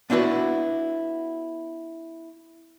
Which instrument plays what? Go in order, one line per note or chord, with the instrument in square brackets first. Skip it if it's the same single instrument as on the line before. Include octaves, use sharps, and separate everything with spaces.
[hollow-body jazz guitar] B3 D4 E4 F#4 B4